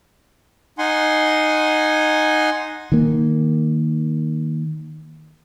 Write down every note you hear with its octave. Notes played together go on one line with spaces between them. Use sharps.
D#4 F#5 G#5 C6
D#3 A#3